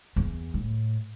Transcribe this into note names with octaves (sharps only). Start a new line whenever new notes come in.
E2
A2